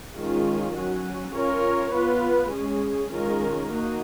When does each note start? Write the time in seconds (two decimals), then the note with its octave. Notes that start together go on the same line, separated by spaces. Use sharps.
0.16 D#3 G#3 C#4 F4
0.75 F#3 C#4 F#4
1.35 C#4 F4 A#4 C#5
1.93 B3 F4 B4
2.53 G#3 C#4 G#4
3.13 D#3 G#3 C#4 F4 A#4
3.71 A#3 D#4 F#4